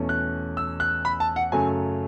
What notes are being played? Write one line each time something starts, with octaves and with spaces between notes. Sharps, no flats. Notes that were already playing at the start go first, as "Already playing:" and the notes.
Already playing: E2 B2 A3 C#4
F#6
E6
F#6
B5
A5
F#5
F#2 C#3 F#3 A3 G#5